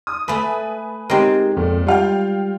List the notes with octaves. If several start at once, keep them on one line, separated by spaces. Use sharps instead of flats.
D#6
A3 B4 E5 G#5 B5
G#3 C4 D#4 G4 A#4
F2 A#2
G3 F4 F5 G5